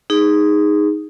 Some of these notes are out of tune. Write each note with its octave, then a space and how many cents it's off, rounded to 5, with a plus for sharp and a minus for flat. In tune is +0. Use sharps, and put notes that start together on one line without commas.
D#4 +0 G#4 -15